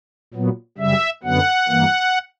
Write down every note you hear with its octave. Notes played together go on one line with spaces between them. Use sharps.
A#2 F#3 B3
F#2 C#3 G3 E5
F#2 D3 F#3 B3 F#5
G2 E3 A#3